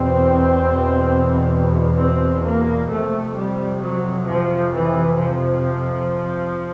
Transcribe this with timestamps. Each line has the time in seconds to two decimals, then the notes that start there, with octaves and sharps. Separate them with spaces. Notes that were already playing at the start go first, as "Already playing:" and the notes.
Already playing: E2 B2 C4
1.99 C4
2.45 A#3
2.90 F2 C3 A3
3.36 G3
3.82 F#3
4.28 F3
4.74 E3
5.19 F3